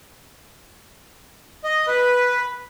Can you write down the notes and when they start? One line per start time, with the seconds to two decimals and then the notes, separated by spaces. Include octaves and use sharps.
1.64 D#5
1.87 B4